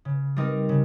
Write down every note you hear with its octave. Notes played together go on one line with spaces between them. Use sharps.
C#3
G3 C4 D#4 A#4
C#3